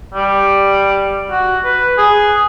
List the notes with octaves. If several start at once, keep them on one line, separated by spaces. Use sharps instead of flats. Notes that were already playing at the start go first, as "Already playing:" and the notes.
G3
F#4
B4
G#4